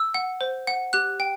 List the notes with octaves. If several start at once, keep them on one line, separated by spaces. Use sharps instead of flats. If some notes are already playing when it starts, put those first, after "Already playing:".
Already playing: E6
F#5
C5
F#5
G4 F#6
G5